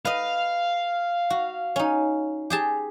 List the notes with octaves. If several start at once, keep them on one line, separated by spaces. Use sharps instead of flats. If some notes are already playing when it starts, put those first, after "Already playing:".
B4 D#5 F5
F#4
C#4 D#4
G4 G#4 A5